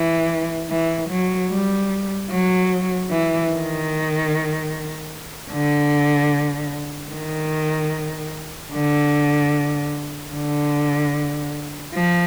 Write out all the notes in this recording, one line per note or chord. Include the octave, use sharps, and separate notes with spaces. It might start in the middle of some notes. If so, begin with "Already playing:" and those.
Already playing: E3
E3
F#3
G3
F#3
E3
D#3
D3
D#3
D3
D3
F3